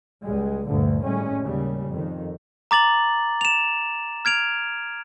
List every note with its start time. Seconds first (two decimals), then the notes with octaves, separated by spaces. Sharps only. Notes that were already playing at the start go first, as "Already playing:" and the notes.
0.23 C#2 G3 G#3
0.68 D2 G2 A#2 D3
1.02 G#1 A2 G3 G#3 C#4
1.43 D#2 C#3 G3
1.89 F2 D#3
2.71 A#5 D6 A6 F#7
3.41 E7 F7
4.25 F6 G#6 D7 F7